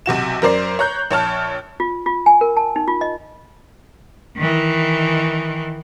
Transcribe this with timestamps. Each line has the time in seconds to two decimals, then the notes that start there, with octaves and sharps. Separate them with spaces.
0.06 B1 C3 F#4 E7
0.42 F#2 A#4 C5 D5 C7
0.79 C#5 A#5 F#6 G6
1.11 A#1 C#5 A5 F6
1.80 F4
2.06 F4
2.26 G#5
2.41 A#4
2.57 A5
2.76 D#4
2.88 F4
3.01 D#5
4.37 D#3 E3